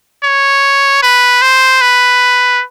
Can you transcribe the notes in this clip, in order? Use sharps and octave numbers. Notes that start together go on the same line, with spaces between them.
C#5
B4
C5
B4